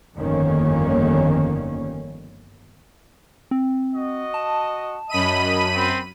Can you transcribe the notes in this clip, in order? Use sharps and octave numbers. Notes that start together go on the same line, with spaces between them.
G1 F2 D#3 A#3 C#4
C4
F#4 D#5
A5
F#2 D#5 B5 D#7
C4